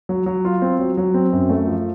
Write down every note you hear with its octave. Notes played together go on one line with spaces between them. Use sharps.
F#3
F#3
F4
C4
F#3
F#3
C4
F#2
A3
F3